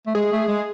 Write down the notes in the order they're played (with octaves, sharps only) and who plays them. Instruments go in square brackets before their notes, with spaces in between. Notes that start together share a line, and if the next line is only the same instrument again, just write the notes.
[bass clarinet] A3
[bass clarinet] G#3 [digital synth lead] G#4
[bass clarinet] A3
G#3